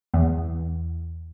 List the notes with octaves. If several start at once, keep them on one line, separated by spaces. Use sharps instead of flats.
E2